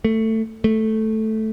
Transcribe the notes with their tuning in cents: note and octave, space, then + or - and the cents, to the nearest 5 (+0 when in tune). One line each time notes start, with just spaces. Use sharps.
A3 +15
A3 -5